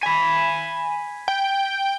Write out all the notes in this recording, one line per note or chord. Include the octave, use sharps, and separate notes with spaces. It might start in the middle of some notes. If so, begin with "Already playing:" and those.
G#5 B5
G5